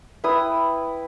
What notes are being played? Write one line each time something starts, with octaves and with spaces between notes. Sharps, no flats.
E4 B4 G5 D#6